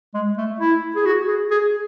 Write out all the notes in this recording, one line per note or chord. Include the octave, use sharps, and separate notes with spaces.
G#3
A3
E4
G#4
F#4
G#4
G#4